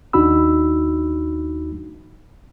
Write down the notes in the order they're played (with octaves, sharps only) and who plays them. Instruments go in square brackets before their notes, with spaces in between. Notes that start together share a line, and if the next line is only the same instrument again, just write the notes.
[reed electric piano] D#2 D4 D#4 F#4 B5 E6